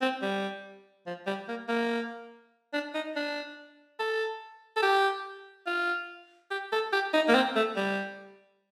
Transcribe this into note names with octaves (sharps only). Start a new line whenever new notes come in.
C4
G3
F3
G3
A#3
A#3
D4
D#4
D4
A4
A4
G4
F4
G4
A4
G4
D#4
A#3
C4
A3
G3